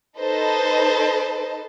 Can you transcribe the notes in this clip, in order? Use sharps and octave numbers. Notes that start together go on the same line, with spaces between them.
D#4 A4 B4 C5 D#5 A5